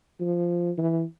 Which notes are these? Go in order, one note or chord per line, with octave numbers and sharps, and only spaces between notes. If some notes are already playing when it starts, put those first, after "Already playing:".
F3
E3